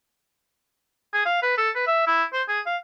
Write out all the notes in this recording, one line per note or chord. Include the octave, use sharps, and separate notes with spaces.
G#4
F5
B4
A4
B4
E5
E4
C5
G#4
F5